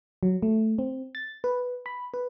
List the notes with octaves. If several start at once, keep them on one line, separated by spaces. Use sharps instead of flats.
F#3
A3
C4
A6
B4
B5
B4